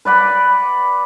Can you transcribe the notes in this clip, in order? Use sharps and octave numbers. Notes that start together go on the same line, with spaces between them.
B4 D5 F#5 B5